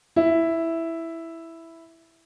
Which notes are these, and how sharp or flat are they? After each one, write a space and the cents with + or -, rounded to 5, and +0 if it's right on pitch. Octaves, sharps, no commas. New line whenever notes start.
E4 +0 E5 +0